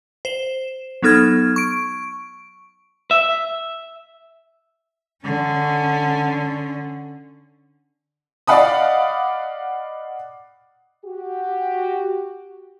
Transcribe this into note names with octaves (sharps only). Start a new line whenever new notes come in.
C5 E7
F#3 B3 D#4 A4 F6 G#6
C#6 D7
E5
D3 C#4
D5 D#5 F5 F#5 B5 D#6
F#4 G4